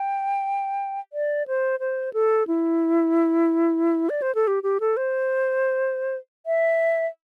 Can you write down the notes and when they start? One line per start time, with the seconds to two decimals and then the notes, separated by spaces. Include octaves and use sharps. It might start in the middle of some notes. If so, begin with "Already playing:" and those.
Already playing: G5
1.13 D5
1.48 C5
1.80 C5
2.13 A4
2.48 E4
4.09 D5
4.22 C5
4.35 A4
4.47 G4
4.63 G4
4.80 A4
4.97 C5
6.46 E5